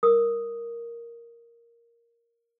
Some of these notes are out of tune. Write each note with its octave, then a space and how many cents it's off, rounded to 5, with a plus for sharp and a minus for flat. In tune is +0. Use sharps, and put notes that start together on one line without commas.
A#4 +0 D#6 +0